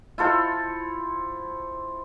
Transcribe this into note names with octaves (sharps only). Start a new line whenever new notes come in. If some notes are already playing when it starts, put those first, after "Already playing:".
E4 F4 A4 C5